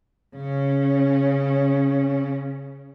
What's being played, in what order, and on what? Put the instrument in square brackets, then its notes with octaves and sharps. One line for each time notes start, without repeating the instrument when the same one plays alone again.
[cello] C#3 C#4